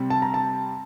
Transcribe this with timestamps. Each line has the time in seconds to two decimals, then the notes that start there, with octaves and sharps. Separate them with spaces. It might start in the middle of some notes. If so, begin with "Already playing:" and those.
Already playing: C3 G3 C4
0.10 A5
0.22 A#5
0.34 A5